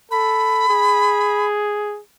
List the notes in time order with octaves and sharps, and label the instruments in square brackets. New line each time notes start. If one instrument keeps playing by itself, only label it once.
[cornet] A4 [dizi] B5
[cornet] G#4